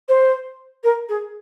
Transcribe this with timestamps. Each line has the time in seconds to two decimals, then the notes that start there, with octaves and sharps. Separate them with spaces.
0.08 C5
0.83 A#4
1.09 G#4